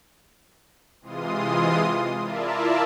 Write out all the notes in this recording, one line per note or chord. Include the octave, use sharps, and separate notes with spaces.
C3 E3 G#3 F4 C6 D#6
E4 F4 A#4 D5 E5 A5